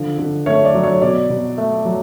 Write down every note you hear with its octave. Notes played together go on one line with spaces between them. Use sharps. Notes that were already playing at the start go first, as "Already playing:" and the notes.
Already playing: D3 F3
D3
A3 C#5
D5
F#3
C#5
B2 D5
B2
A3
F#3